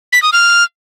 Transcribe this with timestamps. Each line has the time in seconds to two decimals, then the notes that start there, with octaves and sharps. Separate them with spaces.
0.13 B6
0.23 D#6
0.33 F6